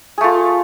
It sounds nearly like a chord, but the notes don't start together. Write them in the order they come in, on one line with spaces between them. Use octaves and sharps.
G#4 A3 F4